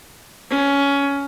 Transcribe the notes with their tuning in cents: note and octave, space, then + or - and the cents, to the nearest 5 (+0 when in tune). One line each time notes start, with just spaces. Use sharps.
C#4 +15